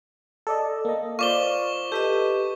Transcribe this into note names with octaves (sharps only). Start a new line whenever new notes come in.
A4 D5 D#5
A#3 D#5
F4 C5 D5 F5 C#6 D6 G7
G4 A4 B4 D#5